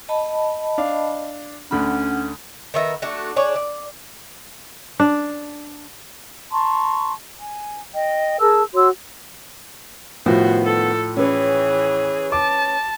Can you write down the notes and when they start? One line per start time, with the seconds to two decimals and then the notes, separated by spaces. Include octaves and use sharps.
0.09 D#5 A5 B5
0.78 D4 F5
1.71 D2 D3 C#4 F#5 B5
2.74 D#3 B3 E5 A#5
3.02 A3 D4 F#4
3.36 D4 G#4 C#5 D5
3.56 D5
5.00 D4
6.51 A5 A#5 C6 C#6
7.38 G#5
7.93 D#5 G5
8.40 G#4 A#4 A5 E6
8.75 F#4 C#5 C6 E6
10.26 A2 D#3 F3 B3 F#4 C5
10.64 A4
11.17 E3 C#4 G#4 B4 C#5
12.32 A5 D6